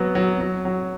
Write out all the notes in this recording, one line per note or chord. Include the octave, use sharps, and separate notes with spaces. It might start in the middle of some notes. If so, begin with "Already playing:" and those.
Already playing: F#3 B3
F#3
F#3
F#3